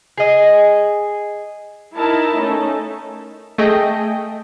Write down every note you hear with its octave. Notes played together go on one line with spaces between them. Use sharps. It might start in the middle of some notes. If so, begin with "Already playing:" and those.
G#4 D#5
D#4 E4 A#4 A5
A3 C#4 D#4
A3 G#4 D#5 G5